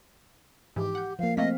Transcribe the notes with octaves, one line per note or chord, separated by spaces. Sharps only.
G#2 E3 F3 G4
F#5 G6
F3 A#3 F5
A3 A#3 C4 D#5 F5 B6